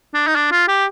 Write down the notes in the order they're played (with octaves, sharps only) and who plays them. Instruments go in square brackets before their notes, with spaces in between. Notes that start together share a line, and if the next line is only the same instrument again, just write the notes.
[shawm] D4
D#4
D4
F4
G4